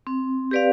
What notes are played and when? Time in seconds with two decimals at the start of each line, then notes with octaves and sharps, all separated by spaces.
0.07 C4
0.51 G4 B4 D5 F5